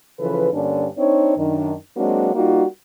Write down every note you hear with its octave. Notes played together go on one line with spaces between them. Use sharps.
C#3 E3 F3 A4 B4
G2 D3 A#3 C#4 D4
C4 D4 D#4 C#5
F#2 D#3 D4
F#3 G#3 A#3 C4 D4 F#4
G3 A#3 D#4 F4 F#4